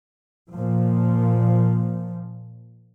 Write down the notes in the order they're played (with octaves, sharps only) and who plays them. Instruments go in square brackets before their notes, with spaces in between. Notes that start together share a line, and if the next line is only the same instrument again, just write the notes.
[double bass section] A#2 F3